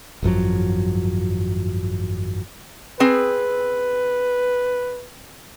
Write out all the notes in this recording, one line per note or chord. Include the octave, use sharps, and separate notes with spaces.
G#1 F#2 F3 F#3
C4 G#4 B4 G#5